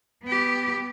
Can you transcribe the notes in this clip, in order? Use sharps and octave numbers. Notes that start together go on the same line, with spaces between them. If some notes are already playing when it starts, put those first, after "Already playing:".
B3 G4